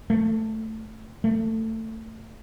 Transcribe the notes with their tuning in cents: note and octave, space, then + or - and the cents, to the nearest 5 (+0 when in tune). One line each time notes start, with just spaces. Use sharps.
A3 +5
A3 +20